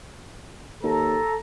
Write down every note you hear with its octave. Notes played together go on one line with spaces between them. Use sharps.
D#2 A4 A#5